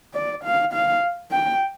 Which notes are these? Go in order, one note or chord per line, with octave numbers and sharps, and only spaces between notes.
D5
F5
F5
G5